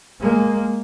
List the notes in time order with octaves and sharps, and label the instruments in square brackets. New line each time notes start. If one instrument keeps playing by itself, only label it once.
[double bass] G#3 A#3